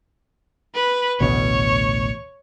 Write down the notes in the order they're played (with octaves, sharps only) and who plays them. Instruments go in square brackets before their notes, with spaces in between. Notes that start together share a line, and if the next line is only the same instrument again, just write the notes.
[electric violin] B4
[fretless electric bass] A1 D2 B2 [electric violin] C#5